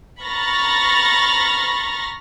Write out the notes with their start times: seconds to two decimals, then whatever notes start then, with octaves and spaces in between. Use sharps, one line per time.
0.24 A#5 B5 C#6 F6 A6 A#6